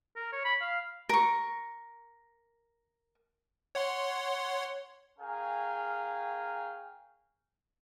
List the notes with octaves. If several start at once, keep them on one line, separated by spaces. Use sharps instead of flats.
A#4
C#5
B5
F5
A#4 C#6
C#5 F#5 C6
C#4 G#4 A#4 F5 G5 G#5